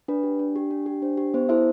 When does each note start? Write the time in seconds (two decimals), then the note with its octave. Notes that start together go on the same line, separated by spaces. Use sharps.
0.08 D4 B4
0.23 G4
0.39 D4
0.56 G4
0.71 D4
0.86 G4
1.02 D4 C5
1.18 G4
1.34 B3 C5
1.49 E4 A4 C5 E5